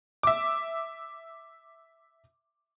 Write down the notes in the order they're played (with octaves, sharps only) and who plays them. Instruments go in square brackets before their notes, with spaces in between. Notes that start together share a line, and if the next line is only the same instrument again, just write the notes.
[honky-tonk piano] E5 D6